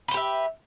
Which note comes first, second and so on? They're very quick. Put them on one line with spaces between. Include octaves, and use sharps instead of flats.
B4 C5 G4 E5